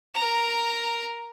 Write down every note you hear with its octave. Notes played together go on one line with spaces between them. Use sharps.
A#4 A#5